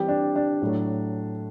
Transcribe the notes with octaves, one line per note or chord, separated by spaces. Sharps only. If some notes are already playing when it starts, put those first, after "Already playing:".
Already playing: E3 G3 C4 G4
D4
D4
A2 F#3 A3